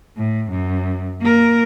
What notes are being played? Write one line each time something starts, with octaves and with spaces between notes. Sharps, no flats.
A2
F#2
A#3 A#4